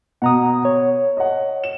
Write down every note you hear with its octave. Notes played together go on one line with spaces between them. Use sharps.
B2 F#5 A#5 D#6
C#5
D#5 F#5
E7